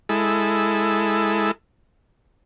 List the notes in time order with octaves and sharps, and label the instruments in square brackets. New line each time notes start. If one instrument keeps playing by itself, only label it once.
[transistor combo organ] G#3 E4 A4